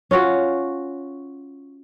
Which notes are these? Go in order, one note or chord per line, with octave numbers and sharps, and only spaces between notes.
C#4 F4 F#4 F5